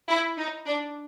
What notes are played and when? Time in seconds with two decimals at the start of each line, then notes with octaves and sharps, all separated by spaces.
0.09 E4
0.37 D#4
0.66 D4